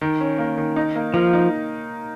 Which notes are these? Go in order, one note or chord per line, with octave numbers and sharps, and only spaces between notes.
D#3
C#4
A#3
D#3
D#4
A#3
F3 A#3
D#4